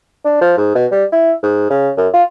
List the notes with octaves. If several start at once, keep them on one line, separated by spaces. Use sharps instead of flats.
D4
F3
G#2
B2
G3
E4
G#2
C#3
F#2
F4